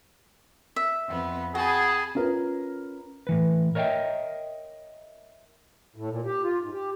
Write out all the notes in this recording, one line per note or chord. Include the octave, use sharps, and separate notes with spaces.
E5
F2 B3
F#4 G#4 G5 A5 B5
C#4 F4 A#4 B4
A2 E3 B4
A#4 C#5 D#5 E5 G5
A2
A#2
G4
F4
G#2
G4